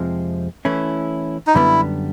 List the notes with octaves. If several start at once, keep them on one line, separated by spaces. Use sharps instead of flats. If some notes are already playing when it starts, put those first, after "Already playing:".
Already playing: F2 C3 F3 G#3
E3 A3 C#4 E4
D#4
F#2 D3 G3 B3 E4